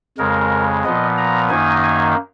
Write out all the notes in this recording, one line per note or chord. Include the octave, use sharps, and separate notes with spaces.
F2 C#3 G#3 A#4
A#2 F3 B3 D#5
A#5
F#2 D#3 A#3 D#4 G#5
G#5